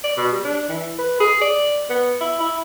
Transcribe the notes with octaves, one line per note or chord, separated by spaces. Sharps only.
D5
B2
G3
D4
E3
B4
G#4
D5
B3
E4
E4